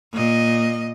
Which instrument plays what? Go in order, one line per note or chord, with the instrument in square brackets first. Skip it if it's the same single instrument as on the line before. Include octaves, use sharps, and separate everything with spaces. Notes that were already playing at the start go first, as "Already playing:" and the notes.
[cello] A#2 D#5